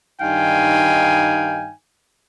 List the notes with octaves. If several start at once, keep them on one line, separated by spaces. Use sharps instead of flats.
G2 D#3 D#4 F5 G5 G#5